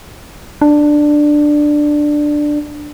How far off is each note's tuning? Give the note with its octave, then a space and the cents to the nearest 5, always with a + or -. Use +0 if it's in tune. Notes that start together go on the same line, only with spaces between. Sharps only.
D4 +10